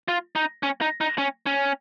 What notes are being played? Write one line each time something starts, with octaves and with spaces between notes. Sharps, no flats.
F4
D#4
C#4
D#4
D#4
C#4
C#4